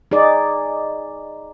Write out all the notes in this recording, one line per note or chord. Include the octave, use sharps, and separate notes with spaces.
D#4 G#4 D5